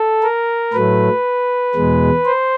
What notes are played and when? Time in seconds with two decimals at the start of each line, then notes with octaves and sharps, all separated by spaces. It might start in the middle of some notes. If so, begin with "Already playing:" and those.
Already playing: A4
0.23 A#4
0.73 A2 F#3 A3 B4
1.75 E2 B2 G#3
2.25 C5